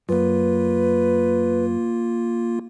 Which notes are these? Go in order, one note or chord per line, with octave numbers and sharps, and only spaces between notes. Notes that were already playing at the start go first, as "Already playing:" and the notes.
F#2 A#3 F4 B4